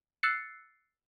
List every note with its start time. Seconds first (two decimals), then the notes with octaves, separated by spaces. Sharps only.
0.23 E6 F#6 A6 C7 C#7